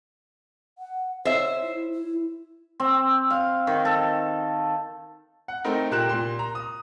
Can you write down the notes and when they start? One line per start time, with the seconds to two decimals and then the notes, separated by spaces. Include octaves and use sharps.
0.78 F#5
1.25 C5 C#5 E5
1.62 E4
1.92 E4
2.80 C4
3.30 F5
3.67 D#3
3.85 A4
5.48 F#5
5.65 A3 C4 D#4 A#4
5.91 A#2 G4 A#4 F#6 E7
6.09 A#2 C6
6.39 A#5
6.55 D#6